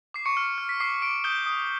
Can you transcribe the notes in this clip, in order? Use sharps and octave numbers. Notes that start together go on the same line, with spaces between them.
D6 C7
C#6 C#7
F6
F6
B6
D6 C7
D6 D7
D#6 G6 G7
D#6